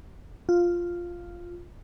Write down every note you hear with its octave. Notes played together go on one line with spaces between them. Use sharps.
F4